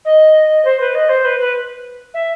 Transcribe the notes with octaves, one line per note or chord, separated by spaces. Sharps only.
D#5
C5
B4
D#5
C5
B4
B4
E5